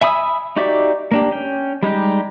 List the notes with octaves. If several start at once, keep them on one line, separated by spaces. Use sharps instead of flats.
E5 G#5 B5 D#6 E6
D#4 F#4 G4 D5 E5
A#3 D4 G4
C#4 G5
G3 G#3 D#4 G4